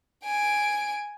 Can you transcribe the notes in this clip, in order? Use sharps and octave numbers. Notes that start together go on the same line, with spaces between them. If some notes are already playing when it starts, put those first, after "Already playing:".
G#5 D7